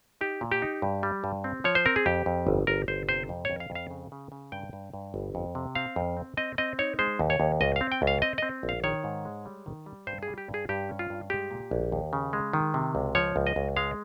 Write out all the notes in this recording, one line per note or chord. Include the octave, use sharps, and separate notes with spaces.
D#4 G4
A#2
G4
D#4
G2
G3
G2
C4
F3 C#5
C5
C4 A#4
G#4
F2 G4
F2
G1
G1 A#4
G1 C5
C3 C5
F2
F2 C#5
F5
F2
F5
C#3
C#3
C#3
G2 G5
G2
G2
G1
F2
C3
C4 F5
F2
C4
C4 D#5
C4 D#5
D#4 C#5
G#3 C5
D#2
C#5
D#2
C#2 D#5
C4 F5
G5
C#2
F5
C4 D#5
C4 D#5
A#1
F5
D#3 C#5
G#2
G#3
G3
D#3
G3
G2 C5
G#4
G3
G4
G2
G#4
G2 G4
C#4
F4
G2
G#3 G4
A#2
A#1
D#2
C#3
G#3
D#3
C3
C#2
F3 C#5
C#2
D#5
C#2
G#3 F5